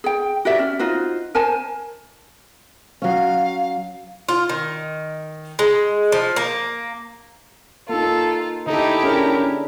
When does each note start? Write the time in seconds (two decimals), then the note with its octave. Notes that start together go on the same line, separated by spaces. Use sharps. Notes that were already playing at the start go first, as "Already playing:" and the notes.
0.04 G#4 G5
0.45 F#4 G4 D5 E5
0.59 C#4
0.79 D#4 F4 F#4 C5
1.35 A#4 C5 G#5 A5
3.02 F#3 C#4 F5
4.29 F4
4.49 D#3
5.59 G#3
6.12 F3
6.36 A#3
7.89 A#3 D#4 F4 A4
8.67 D3 D#4 E4 G4 A4
9.04 C#4 D4 G#4 A#4